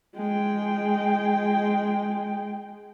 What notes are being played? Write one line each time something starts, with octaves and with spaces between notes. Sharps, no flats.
G#3 G5